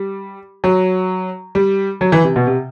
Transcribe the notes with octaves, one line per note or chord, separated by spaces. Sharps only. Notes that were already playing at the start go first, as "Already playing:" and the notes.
Already playing: G3
F#3
G3
F#3
E3
C3
B2
C3